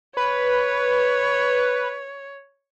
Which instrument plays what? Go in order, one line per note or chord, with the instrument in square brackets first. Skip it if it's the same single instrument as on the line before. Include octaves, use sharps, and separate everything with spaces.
[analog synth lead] B4 [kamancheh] C#5